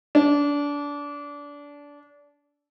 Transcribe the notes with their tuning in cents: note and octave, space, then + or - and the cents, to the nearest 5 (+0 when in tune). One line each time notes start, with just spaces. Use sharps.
D4 -25